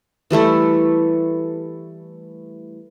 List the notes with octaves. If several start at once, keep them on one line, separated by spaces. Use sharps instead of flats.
E3 G3 A3 E4